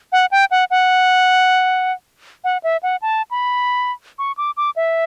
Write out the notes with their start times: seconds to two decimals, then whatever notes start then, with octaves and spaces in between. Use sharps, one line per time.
0.12 F#5
0.31 G5
0.51 F#5
0.71 F#5
2.44 F#5
2.64 E5
2.83 F#5
3.02 A5
3.31 B5
4.19 C#6
4.37 D6
4.57 D6
4.76 E5